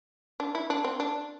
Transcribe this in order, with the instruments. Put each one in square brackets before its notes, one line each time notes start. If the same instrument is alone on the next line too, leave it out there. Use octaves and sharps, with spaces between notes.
[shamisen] D4
E4
D4
C4
D4